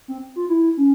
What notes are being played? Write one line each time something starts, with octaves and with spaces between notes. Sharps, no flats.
C4
F4
E4
C#4